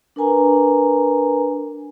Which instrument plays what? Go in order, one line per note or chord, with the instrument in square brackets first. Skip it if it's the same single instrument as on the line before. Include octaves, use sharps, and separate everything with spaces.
[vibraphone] D4 A#4 B4 G#5 A#5